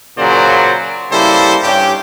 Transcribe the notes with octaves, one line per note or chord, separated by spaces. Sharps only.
A#2 C#3 F#3 A#4 C5 D5
C#3 G3 A#3 E4 A4 C5
G2 C#4 G4